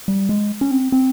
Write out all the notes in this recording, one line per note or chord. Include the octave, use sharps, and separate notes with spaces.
G3
G#3
C#4
C4
C4